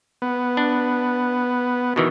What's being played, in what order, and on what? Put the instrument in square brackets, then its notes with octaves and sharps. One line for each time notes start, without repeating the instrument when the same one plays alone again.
[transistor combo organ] B3
[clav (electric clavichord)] D4
B2 D#3 E3